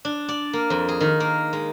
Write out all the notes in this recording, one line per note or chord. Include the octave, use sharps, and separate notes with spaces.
D4
D5
A#3
F2
G#4
D#3
A#3
G#3